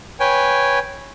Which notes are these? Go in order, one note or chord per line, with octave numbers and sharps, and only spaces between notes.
B4 C#5 G5 G#5